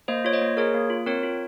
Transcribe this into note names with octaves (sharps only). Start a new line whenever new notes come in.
A#3 C5 D#5
F4 C#5
C5 D#5
A#3
G#4 A#4 C#5
A#3
F4
C4 A#4 C#5
F4